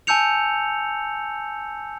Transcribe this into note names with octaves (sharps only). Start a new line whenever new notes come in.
G#5 A5 E6 G6 C#7 F7